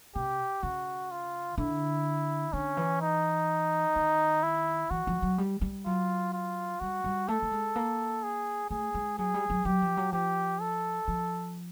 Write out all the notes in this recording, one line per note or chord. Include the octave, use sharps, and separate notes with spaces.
C3 G4
C#3 F#4
F4
D3 E4
D3 C#4
E3
D#4
D#3
E4
E3 F#4
F3
F#3
G3
G3
F#3 F4
F4
G3 F#4
G3
A3 A4
A3
G#3
A#3
G#4
A3 G#4
G#3
F#3 G#4
G3
F#3
F#3 G4
F3
F#3
F3 G4
A4
F3